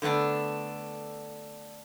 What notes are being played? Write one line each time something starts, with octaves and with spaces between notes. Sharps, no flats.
D3 A3 B3 D4